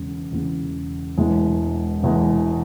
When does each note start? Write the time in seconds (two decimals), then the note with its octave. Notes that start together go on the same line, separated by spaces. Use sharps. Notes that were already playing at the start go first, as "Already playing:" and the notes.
Already playing: E1 E2 C#3
0.31 E1 E2 C#3
1.17 E1 E2 E3 G#3
2.03 E1 E2 E3 G#3